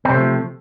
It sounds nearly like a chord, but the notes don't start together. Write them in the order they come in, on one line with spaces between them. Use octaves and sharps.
C4 C3 A3 F3